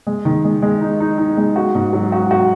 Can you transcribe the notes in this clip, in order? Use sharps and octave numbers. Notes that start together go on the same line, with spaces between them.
G#3
D#3
G#3
G#3
D#4
D#4
D#4
G#3
F#4
G#2
F#3
F#4
F#4